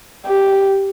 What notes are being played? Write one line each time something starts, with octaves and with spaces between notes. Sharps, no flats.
G4